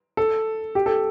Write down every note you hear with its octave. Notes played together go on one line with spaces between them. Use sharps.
A4
G4
A4